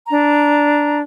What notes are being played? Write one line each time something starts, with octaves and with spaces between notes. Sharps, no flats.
D4 A#5